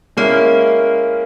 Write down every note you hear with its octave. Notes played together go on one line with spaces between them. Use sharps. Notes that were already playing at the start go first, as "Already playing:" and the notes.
G#3 A#3 C#4 E4 A#4